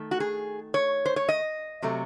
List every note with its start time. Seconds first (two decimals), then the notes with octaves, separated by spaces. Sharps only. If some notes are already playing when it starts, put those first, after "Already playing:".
Already playing: D#3 A3
0.11 F#4
0.20 G#4
0.74 C#5
1.06 C5
1.16 C#5
1.29 D#5
1.82 C3 F#3 A3